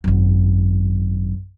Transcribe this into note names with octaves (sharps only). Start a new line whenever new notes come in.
G#1 F#2